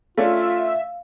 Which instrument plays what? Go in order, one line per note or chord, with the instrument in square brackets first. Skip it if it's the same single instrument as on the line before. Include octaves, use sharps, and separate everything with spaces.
[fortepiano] A3 C#4 D4 [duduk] F4 [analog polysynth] E5 [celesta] F5